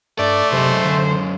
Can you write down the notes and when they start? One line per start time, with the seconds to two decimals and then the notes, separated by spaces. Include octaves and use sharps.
0.19 G2 A3 D5
0.52 F#2 C3 G#3 C5
0.84 D3